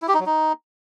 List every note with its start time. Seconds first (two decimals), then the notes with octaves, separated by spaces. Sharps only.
0.02 E4
0.08 G4
0.14 D#4
0.20 F#3
0.26 D#4